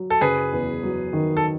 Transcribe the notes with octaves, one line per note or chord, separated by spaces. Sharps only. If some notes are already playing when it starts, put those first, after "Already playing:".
Already playing: F#3
A4
F#1 G#4 B4
E2
F#3
D#3
A4